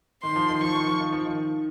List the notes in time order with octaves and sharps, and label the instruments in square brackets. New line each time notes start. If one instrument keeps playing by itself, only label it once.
[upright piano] D#3 [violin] C6
[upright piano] F3
D#3
[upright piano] F3 [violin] C#6
[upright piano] D#3
F3
D#3
F3
D#3